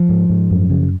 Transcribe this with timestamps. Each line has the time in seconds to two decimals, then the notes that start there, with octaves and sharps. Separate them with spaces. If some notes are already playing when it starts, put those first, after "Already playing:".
Already playing: F3
0.09 G#2
0.30 G#2
0.50 F#2
0.70 C#3